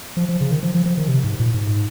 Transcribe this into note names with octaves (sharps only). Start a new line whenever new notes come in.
F3
F3
C#3
D#3
F3
F3
F3
D#3
C3
G#2
A#2
G#2